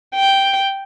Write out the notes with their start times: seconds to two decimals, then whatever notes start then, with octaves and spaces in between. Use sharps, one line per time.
0.16 G5